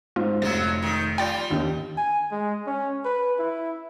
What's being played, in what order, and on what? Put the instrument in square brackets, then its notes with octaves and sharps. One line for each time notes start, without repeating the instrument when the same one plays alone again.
[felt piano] G#2 C4 [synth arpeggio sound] F4
[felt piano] F1 [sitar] F3 F#3 [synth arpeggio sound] A6
[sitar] D#3
[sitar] G3 F4 [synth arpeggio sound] D5 G5
[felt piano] D#2 D#3 D#4
[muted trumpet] G#5
G#3
C#4
B4
E4